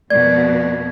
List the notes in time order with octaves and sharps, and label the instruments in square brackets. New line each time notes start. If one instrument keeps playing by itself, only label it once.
[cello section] F2 B2 A#3 [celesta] D5 [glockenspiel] G#6